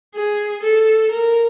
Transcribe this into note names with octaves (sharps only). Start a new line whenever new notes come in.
G#4
A4
A#4